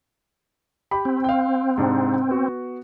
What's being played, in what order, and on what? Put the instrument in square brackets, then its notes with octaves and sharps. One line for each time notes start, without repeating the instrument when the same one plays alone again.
[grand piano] G4 B5
[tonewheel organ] C4
[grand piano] F5 G5
G#2 C3 D4
B3 F#4